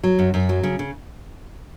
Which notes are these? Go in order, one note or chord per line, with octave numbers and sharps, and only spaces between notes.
F#3
F#2
F#2
F#3
C#3
C#3